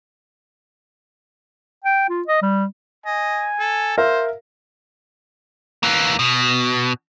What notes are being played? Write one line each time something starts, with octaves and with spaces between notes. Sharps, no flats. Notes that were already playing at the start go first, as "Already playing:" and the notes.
G5
F4
D#5
G3
D#5 G#5
A4
A#4 C5 E5 F5
E3 A#3
B2